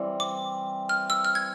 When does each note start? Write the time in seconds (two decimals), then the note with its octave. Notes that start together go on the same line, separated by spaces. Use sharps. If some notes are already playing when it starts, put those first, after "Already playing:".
Already playing: E3 G3 C4
0.20 D6
0.89 F6
1.10 E6
1.25 F6
1.35 G#6